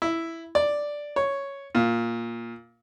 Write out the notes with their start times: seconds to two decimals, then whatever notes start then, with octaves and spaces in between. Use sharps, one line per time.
0.02 E4
0.55 D5
1.16 C#5
1.75 A#2